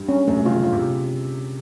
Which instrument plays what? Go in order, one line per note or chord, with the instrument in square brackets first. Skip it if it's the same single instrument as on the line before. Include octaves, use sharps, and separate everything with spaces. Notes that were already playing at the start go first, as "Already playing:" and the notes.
Already playing: [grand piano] G2
[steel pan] C#4
[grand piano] F#2 [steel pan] A3
[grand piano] C3
[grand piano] C#3 [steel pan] F4
[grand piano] D3
[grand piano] C#3 [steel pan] F4
[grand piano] C3